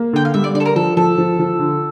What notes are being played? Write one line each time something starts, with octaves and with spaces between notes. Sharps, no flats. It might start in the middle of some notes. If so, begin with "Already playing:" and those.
Already playing: A#3
D3 G5
F5
G3 E5
D5
D3 D5
A4
A#4
F3 A4
F3 A4
F3
F3
D3